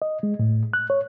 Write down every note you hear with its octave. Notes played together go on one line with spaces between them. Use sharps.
D#5
G#3
A2
F#6
C#5